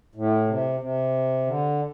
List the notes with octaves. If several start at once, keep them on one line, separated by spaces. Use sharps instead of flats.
A2
C3
C3
D3